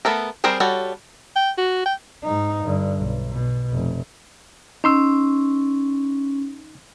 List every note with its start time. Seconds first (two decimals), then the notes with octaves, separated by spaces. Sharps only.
0.05 A3 B3 A4 A#4
0.44 G3 C4 G#4 A#4 C5
0.60 G3 F#4 A4 C#5
1.36 G5
1.58 F#4
1.86 G5
2.23 G#2 D#4
2.64 G2 D3
2.97 B1
3.31 B2
3.72 F1
4.84 C#4 D#4 C6 E6